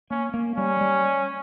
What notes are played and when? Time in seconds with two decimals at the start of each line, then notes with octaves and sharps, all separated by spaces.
0.10 A#3 C#4
0.34 A#3
0.57 G3 C#4
0.81 G3